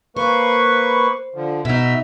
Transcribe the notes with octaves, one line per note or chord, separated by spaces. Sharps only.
A#3 B4 C5 C#6
D3 F3
B2 D#4 E5 E6